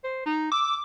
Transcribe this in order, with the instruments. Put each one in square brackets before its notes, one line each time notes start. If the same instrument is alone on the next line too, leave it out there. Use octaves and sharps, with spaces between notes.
[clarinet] C5
D#4
[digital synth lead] D6 [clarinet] E6